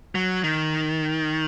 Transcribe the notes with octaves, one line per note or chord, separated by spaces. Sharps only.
F#3
D#3